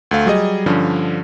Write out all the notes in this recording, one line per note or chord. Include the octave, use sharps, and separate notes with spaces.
D2 A3 F5
F#3 G3 G#4 D#5
G2 D3 F3 C#4